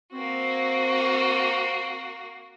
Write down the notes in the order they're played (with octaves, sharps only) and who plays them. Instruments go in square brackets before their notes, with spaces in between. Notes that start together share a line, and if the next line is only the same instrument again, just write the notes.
[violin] A#3 F#4 [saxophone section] C4